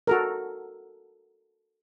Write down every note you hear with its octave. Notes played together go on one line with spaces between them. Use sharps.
F#4 A4 A#4